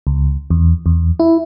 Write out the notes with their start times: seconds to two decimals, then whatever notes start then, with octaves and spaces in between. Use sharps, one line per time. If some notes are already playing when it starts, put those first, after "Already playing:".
0.07 C#2
0.50 E2
0.86 E2
1.20 E4